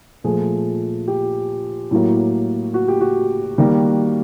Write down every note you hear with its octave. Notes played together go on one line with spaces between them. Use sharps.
A#2 F3 A3 G#4
G4
A2 F#3 A#3
F#4
G4
F#4
D#3 G3 A#3